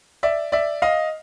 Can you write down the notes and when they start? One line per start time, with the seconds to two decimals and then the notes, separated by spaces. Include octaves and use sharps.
0.23 D5 E5
0.52 D5 E5
0.82 D#5 F5